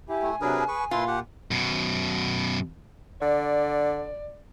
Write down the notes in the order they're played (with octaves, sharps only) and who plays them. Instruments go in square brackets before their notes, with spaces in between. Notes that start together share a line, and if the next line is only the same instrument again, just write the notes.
[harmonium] E4 G4 [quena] G#5
[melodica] A3
[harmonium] C3 F#3 D4 [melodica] G#4 A#4 B4
[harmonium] G#4 [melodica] B4 C#6
[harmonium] A#2 [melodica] E4 B4 C6 [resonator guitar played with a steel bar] F4
[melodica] G4 F#5
[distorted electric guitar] F#2 B2
[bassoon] D3 [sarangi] D5